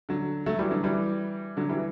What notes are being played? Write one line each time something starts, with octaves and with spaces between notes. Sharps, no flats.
D3 F#3
F#3 A3
E3 G3
D3 F#3
E3 G3
D3 F#3
E3 G3